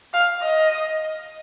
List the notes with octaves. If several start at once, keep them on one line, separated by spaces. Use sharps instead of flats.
F5
D#5